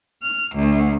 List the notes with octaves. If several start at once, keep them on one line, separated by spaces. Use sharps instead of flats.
F6
D2